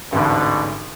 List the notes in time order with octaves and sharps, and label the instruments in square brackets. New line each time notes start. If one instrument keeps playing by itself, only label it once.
[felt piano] A1 D2 G#2 [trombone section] B2 D3